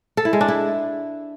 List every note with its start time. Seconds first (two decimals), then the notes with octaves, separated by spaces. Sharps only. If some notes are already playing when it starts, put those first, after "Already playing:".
0.17 A4
0.25 E4
0.33 G#3
0.41 D4
0.48 E4